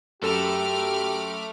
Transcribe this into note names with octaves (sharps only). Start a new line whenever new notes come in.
F#2 A3 G4 A4 B5 D6 F6 E7